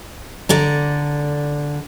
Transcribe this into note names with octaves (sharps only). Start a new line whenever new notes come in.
D3 D5 A#5